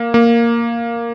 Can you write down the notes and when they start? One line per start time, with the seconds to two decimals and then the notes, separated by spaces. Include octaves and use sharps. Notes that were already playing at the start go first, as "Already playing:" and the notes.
Already playing: A#3
0.14 A#3